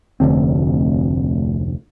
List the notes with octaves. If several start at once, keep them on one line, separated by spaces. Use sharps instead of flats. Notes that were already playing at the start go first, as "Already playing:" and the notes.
F1 D2 D3 C4